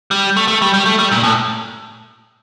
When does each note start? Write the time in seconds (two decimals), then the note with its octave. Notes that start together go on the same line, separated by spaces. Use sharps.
0.11 G3
0.37 A3
0.48 A3
0.62 G3
0.74 G3
0.86 A3
0.99 G3
1.12 A#2
1.23 A2